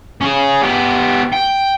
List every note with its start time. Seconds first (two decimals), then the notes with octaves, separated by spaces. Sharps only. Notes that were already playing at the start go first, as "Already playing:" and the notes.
0.21 C#4 G#4
0.63 B3 G4
1.33 G5